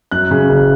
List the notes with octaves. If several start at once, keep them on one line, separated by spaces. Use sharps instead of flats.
F#2 F#6
C#3
F#1